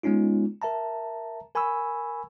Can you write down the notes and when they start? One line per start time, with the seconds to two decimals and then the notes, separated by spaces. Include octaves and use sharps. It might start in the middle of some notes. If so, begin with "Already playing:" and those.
0.03 G#3 B3 C#4 D#4 F4
0.62 A#4 E5 A5 A#5
1.55 A#4 G#5 B5 C#6 E6